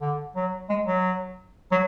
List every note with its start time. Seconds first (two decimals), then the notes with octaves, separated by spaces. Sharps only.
0.01 D3
0.36 F#3
0.70 G#3
0.87 F#3
1.72 F#3